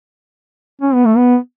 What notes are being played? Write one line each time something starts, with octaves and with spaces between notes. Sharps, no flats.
C#4
B3
A3
B3